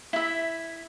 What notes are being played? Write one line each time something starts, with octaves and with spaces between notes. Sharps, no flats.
E4 E5